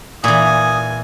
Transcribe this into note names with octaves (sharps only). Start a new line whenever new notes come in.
A#2 E3 G#5 D#6